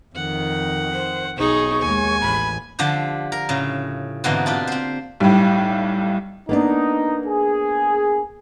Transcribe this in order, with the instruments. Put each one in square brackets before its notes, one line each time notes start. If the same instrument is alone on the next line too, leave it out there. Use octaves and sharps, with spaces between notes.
[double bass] F2 D#3 [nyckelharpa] F#5
[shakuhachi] C5
[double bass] B1 [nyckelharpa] D#4 G#4 [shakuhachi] C#6
[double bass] D#2 G#3 [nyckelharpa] G#5
[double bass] A1 [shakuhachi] B5
[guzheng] D3 F3 G4 C5
A#4
A2 C#3
G#2 B2 D3 E3 A#3 C4
D4 F4 G4
C4 C5
[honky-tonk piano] B1 A2 [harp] G3
[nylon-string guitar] A#3 B3 D4 [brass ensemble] D#4
[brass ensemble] G#4